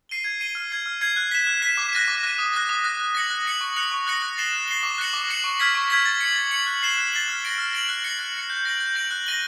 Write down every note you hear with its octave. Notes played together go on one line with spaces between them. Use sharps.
C7 D#7 G7
G#6
C7 D#7 G7
F6
G#6 C7
F6
G#6 C7
F#6
B6 E7
F#6
B6 E7
D6
F#6 A#6 D#7
D6
F#6 A#6 D#7
D#6
F#6 A#6
D#6
F#6 A#6
F#6
A#6 C#7 F#7
F#6
A#6 C#7 F#7
C#6
F#6 A#6 C#7 F7
C#6
F#6 A#6 C#7 F7
F#6
A6 C7 E7 G7
F#6
A6 C7 E7 G7
D6
F#6 A#6 C#7 F#7
D6
F#6 A#6 C#7 F#7
C#6
F6 G#6 B6
C#6
F6 G#6 B6
A6
C#7 F#7
A6
C#7 F#7
F#6
A6 C7 E7 G7
F#6
A6 C7 E7 G7
F6
A#6 D7 F#7
F6
A#6 D7 F#7
F#6
A#6 C#7 F#7
F#6
A#6 C#7 F#7
G6
A#6 D7 F#7
G6
A#6 D7 F#7
F#6
A#6 D#7 G7